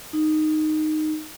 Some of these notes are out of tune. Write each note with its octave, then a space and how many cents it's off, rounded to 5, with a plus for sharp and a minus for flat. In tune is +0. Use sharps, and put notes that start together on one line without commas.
D#4 -10